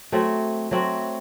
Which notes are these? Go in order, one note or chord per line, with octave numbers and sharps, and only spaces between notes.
F#3 A3 C4 F#4
F#3 A3 C4 F#4